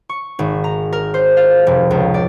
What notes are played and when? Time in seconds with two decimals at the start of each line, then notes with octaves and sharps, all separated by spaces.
0.09 C#6
0.39 G#1
0.64 A#5
0.93 A#4
1.14 C5
1.37 F5
1.67 F1
1.91 C#2
2.14 D5